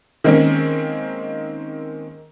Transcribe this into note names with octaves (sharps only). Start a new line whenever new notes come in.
D#3 G#3 A#3 C4 C#4